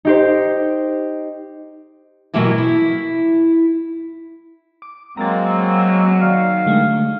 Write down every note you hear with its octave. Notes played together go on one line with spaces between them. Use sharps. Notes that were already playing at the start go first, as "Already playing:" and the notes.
D#4 G4 C5
B2 E3 F#3 A#3 E4 G4
E4
D6
F#3 G#3 A#3 C4 F#4 A#5 A6
G#5 E6
D#3 D5 F5
D3 G#3 A3